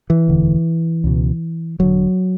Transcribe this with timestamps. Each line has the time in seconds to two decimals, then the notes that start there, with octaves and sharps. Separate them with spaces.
0.10 E3
0.28 E1 D2 D3
1.04 C#2 B2
1.79 E1 D2 D3 F#3